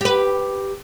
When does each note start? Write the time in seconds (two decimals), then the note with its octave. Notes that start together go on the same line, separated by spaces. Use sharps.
0.01 G4 B4